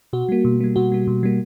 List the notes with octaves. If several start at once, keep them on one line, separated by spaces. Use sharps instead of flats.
B2 F#4
G3 A#3
B2
G3 A#3
B2 F#4
G3 A#3
B2
G3 A#3